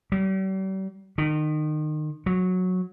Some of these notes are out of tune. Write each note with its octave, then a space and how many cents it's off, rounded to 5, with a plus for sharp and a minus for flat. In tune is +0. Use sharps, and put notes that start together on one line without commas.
G3 -40
D#3 -30
F#3 -15